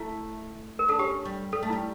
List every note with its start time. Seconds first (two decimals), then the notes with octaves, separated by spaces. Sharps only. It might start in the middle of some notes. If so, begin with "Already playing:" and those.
Already playing: A3 E4
0.79 A#4
0.89 D4 A4
0.99 C#4 G4
1.25 G3
1.52 G3 A4
1.63 A3
1.70 G3 E4